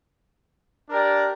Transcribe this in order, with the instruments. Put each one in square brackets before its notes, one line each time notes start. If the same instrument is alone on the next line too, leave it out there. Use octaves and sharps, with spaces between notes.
[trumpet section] D4 G4 A#4 D5